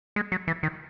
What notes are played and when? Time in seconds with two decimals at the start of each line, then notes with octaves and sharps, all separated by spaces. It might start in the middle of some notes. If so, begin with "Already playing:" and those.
0.16 G#3
0.32 F#3
0.48 E3
0.63 D#3